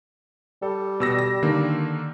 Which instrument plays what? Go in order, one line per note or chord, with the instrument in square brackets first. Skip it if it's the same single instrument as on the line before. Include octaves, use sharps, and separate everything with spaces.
[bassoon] G3 [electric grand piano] A4
[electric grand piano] B2 E6 A#6
A#6
D3 D#3 A#3